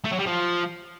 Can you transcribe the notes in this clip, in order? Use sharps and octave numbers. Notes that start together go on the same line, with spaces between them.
A3
F#3
G3
F3